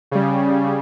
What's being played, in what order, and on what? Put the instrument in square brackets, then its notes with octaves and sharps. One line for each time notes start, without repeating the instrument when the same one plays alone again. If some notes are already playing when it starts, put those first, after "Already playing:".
[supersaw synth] C#3 G3